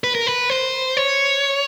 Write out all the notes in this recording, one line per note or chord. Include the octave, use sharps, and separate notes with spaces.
B4
A#4
B4
C5
C#5